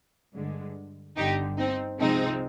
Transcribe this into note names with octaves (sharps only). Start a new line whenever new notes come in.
G2 D3 G#3
G1 G2 D3 D#4 G4
C4 D#4
C2 C3 F3 G#3 C4 D#4